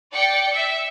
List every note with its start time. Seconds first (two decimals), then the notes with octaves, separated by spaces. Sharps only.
0.13 D5 G5 C#7
0.54 E5